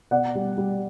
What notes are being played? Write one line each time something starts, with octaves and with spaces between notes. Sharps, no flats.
B2 D5 F#5
G3
G3